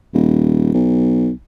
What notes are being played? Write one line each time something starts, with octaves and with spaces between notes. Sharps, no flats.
D#1
B1